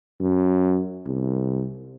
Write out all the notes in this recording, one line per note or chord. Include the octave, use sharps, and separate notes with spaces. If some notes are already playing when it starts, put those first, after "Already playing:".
F#2
C2